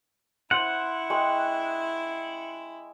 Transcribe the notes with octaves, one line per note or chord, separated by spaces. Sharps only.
E4 C5 F#5
G#3 G5 C#6